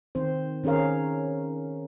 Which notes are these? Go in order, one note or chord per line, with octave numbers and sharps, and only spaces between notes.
D#3 C4 C5
D#3 C#4 G#4 A#4 F5